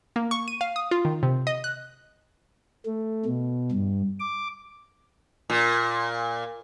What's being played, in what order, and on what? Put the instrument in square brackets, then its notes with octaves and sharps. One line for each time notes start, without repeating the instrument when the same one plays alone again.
[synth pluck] A#3
C#6
D#7
F5
D#6
F4
D#3
C3
D#5
F#6
[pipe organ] A3
B2
G2
D6
[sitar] A#2